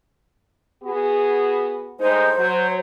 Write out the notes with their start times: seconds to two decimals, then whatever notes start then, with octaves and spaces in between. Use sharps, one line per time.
0.84 B3 F#4 G#4
2.00 A2 G#3 D#4 C5
2.37 F#3